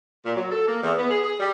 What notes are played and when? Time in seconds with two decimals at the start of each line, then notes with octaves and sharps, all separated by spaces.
0.25 A#2
0.36 F#3
0.51 A4
0.67 A#3
0.82 E2
0.97 B3
1.10 G#4
1.23 G#4
1.40 G3